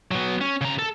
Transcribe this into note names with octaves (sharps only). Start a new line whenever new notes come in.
F#3 B3
C#4
C#3 A#5
A4